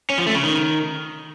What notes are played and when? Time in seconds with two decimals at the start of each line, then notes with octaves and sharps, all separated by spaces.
0.10 C#4
0.18 F3
0.26 A3
0.35 C#3
0.43 D#3